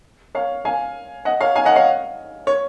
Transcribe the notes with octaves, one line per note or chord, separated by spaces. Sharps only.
C#5 F5
F5 G#5
D#5 F#5
C#5 F5
F5 G#5
D#5 F#5
C#5 F5
C#5